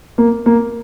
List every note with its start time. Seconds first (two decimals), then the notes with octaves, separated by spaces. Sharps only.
0.18 A#3
0.46 A#3